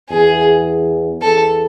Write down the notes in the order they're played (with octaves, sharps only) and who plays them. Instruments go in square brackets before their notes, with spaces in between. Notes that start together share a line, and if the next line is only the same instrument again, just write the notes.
[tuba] E2 [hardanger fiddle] G#4
[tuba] E2 [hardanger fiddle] A4